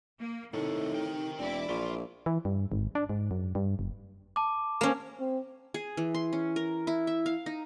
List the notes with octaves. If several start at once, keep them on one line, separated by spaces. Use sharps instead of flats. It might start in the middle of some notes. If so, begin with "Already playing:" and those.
A#3
A2 C3 D#3 A3 D#4
A#4 G5
E1 E3 C4 E4 D5 D6
A#1 F4
E3
G2
G#1
D4
G#2
F#2
G2
F#1
A5 D6
A#3 C#4
C4
G#4
E3
C6
C#4
A#4
E4
E5
F5
D#4